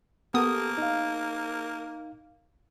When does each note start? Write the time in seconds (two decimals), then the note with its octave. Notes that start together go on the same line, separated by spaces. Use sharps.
0.34 A#3 B3 G4 A4 D#6
0.78 D#4 F5